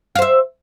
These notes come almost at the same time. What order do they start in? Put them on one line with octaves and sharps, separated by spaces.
F5 C5 E5